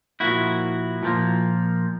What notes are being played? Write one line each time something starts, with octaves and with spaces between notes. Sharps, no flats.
A#2 F3 A#3 E4 F#4
A#2 F3 A#3